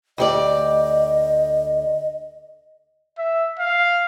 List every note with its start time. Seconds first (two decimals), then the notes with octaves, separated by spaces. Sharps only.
0.18 D2 G4 D5 D#5
3.18 E5
3.59 F5